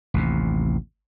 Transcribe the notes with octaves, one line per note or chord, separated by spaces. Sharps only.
A1 D#2 C3